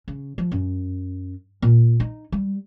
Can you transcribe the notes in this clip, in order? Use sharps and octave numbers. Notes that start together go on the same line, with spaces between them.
C#3
F3
F#2
A#2
D#4
G3